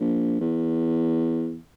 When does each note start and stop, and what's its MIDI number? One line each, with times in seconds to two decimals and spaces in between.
0.01 0.40 34
0.41 1.58 40